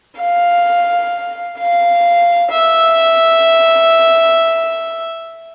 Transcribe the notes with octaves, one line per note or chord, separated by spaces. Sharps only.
F5
F5
E5